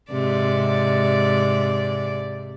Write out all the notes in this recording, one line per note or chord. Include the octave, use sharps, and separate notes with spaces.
G#2 C3 D5